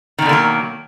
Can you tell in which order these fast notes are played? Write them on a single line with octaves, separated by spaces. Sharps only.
D#3 B2 D3 A#3 F#3